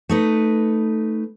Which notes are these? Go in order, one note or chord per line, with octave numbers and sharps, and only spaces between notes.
A3 D#4 B4